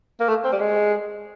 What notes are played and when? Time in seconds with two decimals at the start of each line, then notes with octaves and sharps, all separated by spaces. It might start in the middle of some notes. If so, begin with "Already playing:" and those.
0.20 A#3
0.29 A3
0.44 C4
0.52 G3
0.60 G#3